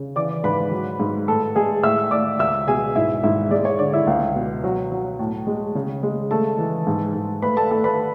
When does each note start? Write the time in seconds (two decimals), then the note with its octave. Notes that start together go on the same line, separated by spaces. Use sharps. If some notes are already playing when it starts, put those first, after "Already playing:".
Already playing: C#3
0.16 E3 D5 D6
0.44 G#2 B4 B5
0.71 F#3
1.00 G#2
1.27 A2 A4 A5
1.56 G#3 G#4 G#5
1.83 A2 E5 E6
2.11 A2 D5 D6
2.39 C#2 E5 E6
2.67 B2 G#4 G#5
2.96 G#2 E4 E5
3.23 G#2 E4 E5
3.51 G#3 D5
3.65 C#5
3.79 D3 D5
3.93 E4 E5
4.07 C#2
4.35 B2
4.64 F#3
4.92 F#3
5.19 A2
5.47 G#3
5.75 C#3
6.03 G#3
6.31 A3 A4 A5
6.59 E3
6.87 G#2
7.14 G#2
7.42 A3 B4 B5
7.57 A4 A5
7.71 A3 A4 A5
7.84 B4 B5